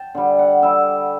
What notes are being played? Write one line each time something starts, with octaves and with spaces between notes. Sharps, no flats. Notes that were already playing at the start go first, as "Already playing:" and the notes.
Already playing: G5 A5
D3 G3
F#5
D3 G3 E5